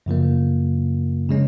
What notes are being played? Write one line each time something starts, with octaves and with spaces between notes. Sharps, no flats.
F#2 C#3 F3 A#3
C#3 G#3 C#4